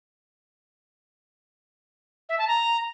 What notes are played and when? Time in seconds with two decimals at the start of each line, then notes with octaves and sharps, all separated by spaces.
2.29 E5
2.38 A5
2.48 A#5